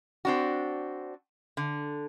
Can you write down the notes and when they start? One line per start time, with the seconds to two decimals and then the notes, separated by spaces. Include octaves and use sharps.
0.25 C4 D4 F#4
1.57 D3